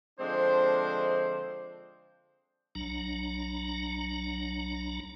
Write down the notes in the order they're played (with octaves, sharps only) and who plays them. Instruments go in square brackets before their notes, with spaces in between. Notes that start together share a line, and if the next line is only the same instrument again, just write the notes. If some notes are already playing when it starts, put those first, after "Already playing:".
[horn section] D3 F3 G#3 C4 D4 C5
[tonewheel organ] B1 F#3 D4 A#5